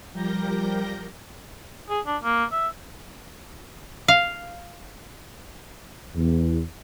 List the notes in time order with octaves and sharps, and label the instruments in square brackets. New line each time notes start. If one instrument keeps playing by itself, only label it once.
[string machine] F3 G3 G4 A#4 G6 A#6
[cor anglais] G#4
D4
A#3
E5
[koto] F5
[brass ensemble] E2